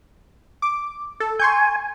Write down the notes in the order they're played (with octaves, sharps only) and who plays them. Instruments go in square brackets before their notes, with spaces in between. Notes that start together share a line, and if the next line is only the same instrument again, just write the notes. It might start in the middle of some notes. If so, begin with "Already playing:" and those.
[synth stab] D6
A4
[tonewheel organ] G#5 [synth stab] C6 C#6 G6